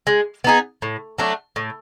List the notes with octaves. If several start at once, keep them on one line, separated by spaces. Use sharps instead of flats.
G#3
B3 D#4 G#4
A2
F#3 A3 D4
A2